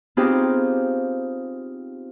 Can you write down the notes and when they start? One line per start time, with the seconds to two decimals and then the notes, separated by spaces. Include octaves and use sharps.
0.17 B3 C4 D#4 F4 G4 G#4